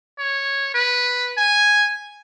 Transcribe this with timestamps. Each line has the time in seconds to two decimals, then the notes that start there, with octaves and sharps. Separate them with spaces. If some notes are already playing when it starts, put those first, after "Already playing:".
0.19 C#5
0.75 B4
1.38 G#5